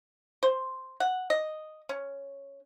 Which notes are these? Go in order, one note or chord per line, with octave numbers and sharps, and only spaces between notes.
C5
F#5
D#5
C#4